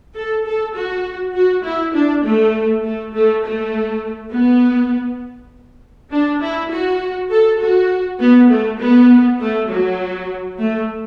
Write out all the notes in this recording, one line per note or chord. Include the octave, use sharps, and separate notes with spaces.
A4
A4
F#4
F#4
E4
D4
A3
A3
A3
A3
B3
D4
E4
F#4
A4
F#4
B3
A3
B3
A3
F#3
A3